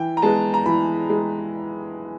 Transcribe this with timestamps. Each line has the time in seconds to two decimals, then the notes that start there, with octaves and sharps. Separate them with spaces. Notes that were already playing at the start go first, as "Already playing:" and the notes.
Already playing: E3 G5
0.17 A#5
0.22 G#3 B3 A5
0.54 A#5
0.66 E3 B5
1.10 G#3